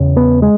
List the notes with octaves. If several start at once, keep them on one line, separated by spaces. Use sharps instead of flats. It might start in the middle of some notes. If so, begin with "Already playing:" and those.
Already playing: E2 C#3
B3
G#3